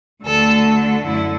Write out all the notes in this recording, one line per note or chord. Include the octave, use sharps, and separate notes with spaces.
D2 D3 A3 A4
F#2 D3 E4